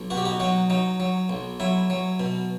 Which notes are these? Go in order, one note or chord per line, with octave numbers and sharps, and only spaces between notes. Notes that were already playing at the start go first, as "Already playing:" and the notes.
Already playing: B1
B2 F#4
G4
D#4 F#4
F#3 D#4 F#4
F#3 D#4
F#3
B1
F#3 E4
F#3
B2